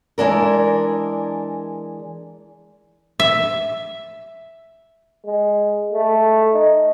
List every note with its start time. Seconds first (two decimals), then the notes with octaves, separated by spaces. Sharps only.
0.18 E3 G#3 D4 A#4
3.20 E5
5.25 G#3
5.92 A3
6.53 D#4